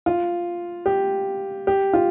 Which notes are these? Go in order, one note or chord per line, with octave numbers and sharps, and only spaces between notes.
F4
G4
G4
F4